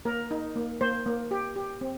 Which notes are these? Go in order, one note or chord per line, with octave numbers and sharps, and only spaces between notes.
A#3 A#4
D#4
A#3
A#3 C5
A#3
G4
G4
C4